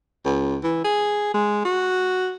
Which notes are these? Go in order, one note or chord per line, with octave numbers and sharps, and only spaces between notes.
C#2
E3
G#4
G#3
F#4